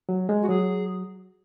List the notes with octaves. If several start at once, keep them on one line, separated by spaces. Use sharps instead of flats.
F#3
G#3
F#4
F#3 G#4